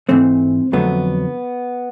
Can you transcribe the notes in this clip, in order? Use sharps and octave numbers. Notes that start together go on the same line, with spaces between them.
G#2 E3 A3 C4
F2 D3 F#3 A3 B3